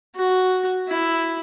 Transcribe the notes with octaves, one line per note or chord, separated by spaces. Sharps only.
F#4
E4